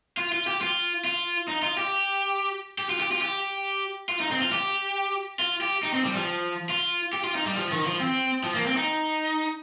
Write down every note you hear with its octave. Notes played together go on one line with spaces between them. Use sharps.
F4
F4
G4
F4
F4
D#4
F4
G4
G4
F4
G4
F4
G4
F4
D#4
C4
F4
G4
F4
G4
D#4
C4
G3
F3
F4
G4
F4
D#4
G3
F3
D#3
F3
C4
F3
A#3
C4
D#4